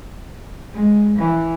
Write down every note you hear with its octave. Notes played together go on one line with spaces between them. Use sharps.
G#3
E3